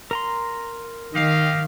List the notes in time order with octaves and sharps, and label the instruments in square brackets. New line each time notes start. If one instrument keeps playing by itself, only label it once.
[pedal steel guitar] A#4 A#5 C6
[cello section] D#3 [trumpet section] G4 D#5 F5